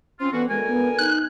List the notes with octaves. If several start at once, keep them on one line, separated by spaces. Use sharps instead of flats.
C4 C#4 F4
D3 E3 B3 F#4
D2 G#3 A#4 G#5
B3
D#4 F#6